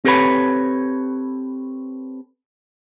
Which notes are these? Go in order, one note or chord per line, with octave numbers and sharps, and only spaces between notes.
C4 G4 A4 B4 C#5 B5